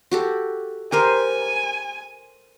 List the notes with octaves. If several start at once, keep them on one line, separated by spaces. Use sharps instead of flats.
F#4 G4 A4
G4 A#4 C5 G#5